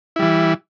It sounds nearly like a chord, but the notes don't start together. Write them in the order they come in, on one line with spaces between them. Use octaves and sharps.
E4 G3 E3